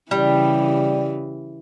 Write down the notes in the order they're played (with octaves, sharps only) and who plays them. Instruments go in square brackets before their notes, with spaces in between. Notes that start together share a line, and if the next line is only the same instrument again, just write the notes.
[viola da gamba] C#3 E3 [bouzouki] G3